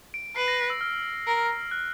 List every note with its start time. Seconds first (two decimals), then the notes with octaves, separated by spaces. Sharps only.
0.14 D7
0.36 B4 C7
0.48 A#6
0.70 E6
0.81 F6
1.27 A#4
1.71 F#6